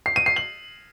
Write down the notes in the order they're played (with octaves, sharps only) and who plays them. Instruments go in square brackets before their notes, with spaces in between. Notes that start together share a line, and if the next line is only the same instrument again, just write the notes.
[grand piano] C7
D#7
C7
F#7